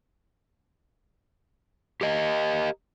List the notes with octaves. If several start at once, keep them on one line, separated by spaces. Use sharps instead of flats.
G4 A#4 D#5